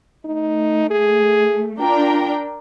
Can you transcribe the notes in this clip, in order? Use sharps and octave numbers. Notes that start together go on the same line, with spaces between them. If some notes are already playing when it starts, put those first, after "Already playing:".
A3 D#4
G#4
D4 F4 A#4 G5